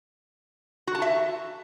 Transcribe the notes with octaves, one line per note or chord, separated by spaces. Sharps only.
F#4
A5
E5